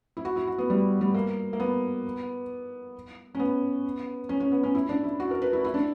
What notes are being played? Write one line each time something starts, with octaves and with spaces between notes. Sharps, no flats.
E4
F#4
E4
F#4
B3
G3
G3
A#3
A#3
B3
C#4
B3
C#4
C#4
B3
C#4
E4
D4
E4
F#4
A#4
B4
E4
E4
D4